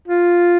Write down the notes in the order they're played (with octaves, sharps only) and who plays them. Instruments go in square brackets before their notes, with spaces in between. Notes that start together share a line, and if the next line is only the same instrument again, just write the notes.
[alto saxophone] F4